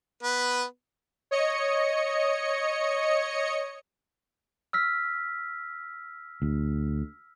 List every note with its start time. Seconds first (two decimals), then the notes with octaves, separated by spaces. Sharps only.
0.23 B3 B4
1.31 C#5 D#5 C#7
4.73 E6 F6 B6
6.42 D2